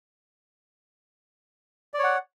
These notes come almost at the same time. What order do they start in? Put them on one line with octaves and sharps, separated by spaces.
D5 C#5 F#5